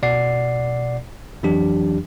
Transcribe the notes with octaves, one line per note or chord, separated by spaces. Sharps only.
B2 D5 F#5 C7
F2 E3 F#3 D4 G4